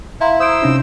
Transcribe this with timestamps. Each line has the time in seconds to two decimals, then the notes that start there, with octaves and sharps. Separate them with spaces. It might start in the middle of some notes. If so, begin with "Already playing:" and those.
0.21 E4 F5 A#5 C6
0.40 C5 D#6 E6 D7
0.62 C3 C#4 D#4